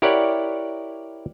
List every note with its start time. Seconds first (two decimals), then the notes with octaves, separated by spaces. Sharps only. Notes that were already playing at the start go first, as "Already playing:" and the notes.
0.02 E4 G4 A#4 C#5 D5 F#5